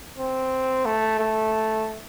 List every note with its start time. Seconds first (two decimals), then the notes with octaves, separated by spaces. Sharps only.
0.18 C4
0.85 A3
1.19 A3